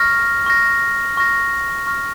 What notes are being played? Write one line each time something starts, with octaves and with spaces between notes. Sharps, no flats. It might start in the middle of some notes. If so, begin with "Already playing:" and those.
Already playing: C#6 F6 A#6
C#6 F6 A#6
C#6 F6 A#6
C#6 F6 A#6